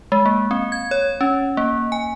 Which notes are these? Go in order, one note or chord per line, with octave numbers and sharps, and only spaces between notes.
G#3
A#3
C4
G#6
C#5
C#4
A#3
G#5